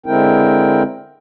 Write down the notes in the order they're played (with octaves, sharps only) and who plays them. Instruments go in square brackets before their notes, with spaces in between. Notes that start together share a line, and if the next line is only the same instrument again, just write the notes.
[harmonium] D3 G#3 C4 E4 A#4 G5